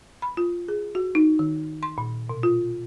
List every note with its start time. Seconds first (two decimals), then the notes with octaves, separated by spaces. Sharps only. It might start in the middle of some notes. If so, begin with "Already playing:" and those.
0.22 B5
0.37 F4
0.68 G#4
0.95 F#4
1.15 D#4
1.39 D#3
1.83 C6
1.98 A#2
2.29 B2
2.43 F4